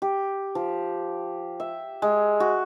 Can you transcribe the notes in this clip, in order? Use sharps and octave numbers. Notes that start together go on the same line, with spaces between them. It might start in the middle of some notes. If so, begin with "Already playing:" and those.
G4
F3
E5
G#3
F#4